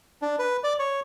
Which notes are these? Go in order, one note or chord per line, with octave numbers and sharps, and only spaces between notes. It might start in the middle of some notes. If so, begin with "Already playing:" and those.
D4
B4
D5
C#5